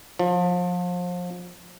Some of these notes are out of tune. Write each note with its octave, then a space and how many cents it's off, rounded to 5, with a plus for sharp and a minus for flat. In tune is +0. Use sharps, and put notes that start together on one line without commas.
F3 +30